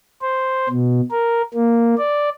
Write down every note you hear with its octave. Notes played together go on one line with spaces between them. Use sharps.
C5
B2
A#4
A#3
D5